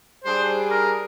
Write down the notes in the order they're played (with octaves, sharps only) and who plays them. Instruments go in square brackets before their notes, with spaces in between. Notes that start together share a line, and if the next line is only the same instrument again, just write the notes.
[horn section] G3 D4 G#4 [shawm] C5
[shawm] A#4